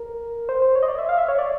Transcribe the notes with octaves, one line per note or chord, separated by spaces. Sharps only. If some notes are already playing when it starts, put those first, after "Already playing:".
Already playing: A#4
C5
C5
C#5
D#5
D5
E5
F5
E5
C#5
D5